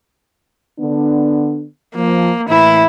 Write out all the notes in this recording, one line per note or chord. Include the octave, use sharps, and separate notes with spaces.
D3 B3 D4
F3 A#3
A2 E3 E4